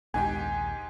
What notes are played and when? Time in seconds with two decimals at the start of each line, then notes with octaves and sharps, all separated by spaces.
0.14 A#1 D#2 G#2 D#4 G4 G#5